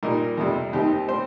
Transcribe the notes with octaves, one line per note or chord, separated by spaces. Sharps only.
A#2 G3 D#4 A#4
F2 C3 G3
D#2 D#3 C4 D#4 G4
G3 C4 C5